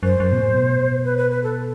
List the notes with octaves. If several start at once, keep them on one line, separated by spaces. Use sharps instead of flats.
F#2 C5
F#2
B2
A2
B2
B4
B4
B4
A4